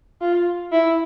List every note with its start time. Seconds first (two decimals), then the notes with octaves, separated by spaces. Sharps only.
0.21 F4
0.72 E4